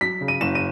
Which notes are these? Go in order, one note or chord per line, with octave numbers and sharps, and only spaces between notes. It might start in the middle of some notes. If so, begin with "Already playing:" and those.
F#3 B6
C#3
D#7
F#1 E7
D#7